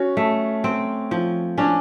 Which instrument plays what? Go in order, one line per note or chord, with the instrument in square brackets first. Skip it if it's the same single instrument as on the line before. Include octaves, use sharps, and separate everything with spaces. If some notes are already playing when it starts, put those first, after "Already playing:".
Already playing: [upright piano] C#4 [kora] F#4
[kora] A3
C4
F3
[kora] C#4 [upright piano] D4